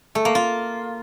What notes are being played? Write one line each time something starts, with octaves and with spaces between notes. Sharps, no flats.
A3
A#3
F4